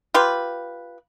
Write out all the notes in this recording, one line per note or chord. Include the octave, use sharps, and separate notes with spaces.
F4 G4 B4